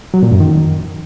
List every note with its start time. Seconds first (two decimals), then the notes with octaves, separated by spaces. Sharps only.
0.14 F#3
0.23 A#2
0.31 F#2
0.40 D#3